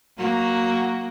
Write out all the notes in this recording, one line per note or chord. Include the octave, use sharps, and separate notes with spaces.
F#3 A#3 F#4